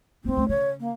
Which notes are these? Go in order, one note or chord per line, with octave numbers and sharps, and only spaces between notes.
A#3 C4 D#4
C#2 A3
C#3 C#5
A#3